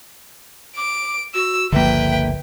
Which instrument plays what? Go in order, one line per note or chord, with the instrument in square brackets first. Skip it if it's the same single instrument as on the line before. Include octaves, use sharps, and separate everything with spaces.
[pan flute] D6 [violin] D7
[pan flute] F#4 [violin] E6
[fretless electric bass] G1 C#2 F3 [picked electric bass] D3 A#3 [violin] B4 G5 [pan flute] E5